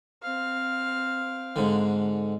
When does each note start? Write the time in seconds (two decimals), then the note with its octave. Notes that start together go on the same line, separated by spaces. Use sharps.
0.23 C4 F5
1.56 G#2 D3